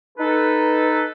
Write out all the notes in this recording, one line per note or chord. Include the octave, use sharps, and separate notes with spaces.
D#4 A4 B4